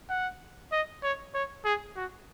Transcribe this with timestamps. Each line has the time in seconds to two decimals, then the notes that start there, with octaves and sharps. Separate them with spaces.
0.10 F#5
0.72 D#5
1.03 C#5
1.34 C#5
1.65 G#4
1.96 F#4